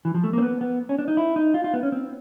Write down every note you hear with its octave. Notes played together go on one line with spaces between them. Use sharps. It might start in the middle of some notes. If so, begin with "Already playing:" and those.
E3
F3
A3
A#3
C4
B3
B3
C#4
D4
D#4
E4
D#4
F4
F4
B3
C#4
C4